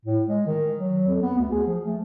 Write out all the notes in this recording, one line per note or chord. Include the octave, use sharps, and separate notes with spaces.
A2
G#3
D#3
F#3
F2
B3
D2
G#4
F3
A3